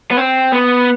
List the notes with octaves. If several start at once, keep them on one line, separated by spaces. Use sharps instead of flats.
B3
C4
B3